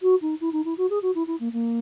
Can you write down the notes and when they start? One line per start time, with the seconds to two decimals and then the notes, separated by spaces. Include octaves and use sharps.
0.02 F#4
0.22 D#4
0.41 E4
0.53 D#4
0.65 E4
0.78 F#4
0.90 G#4
1.02 F#4
1.15 E4
1.27 E4
1.40 A#3
1.53 A#3